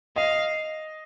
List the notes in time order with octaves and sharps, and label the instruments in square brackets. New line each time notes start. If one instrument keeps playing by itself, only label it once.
[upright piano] D#5 [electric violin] F5